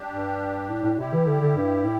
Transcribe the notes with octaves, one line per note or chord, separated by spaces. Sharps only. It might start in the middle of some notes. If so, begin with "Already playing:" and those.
Already playing: G3 D4 G4
G2
A2
A2
C3 G3 E4 G4
E3
D3
D3
G2
A2